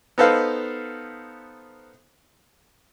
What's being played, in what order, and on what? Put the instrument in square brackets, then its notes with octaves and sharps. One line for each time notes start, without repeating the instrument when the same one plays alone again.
[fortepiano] B3 D#4 A4 B4 C5 F5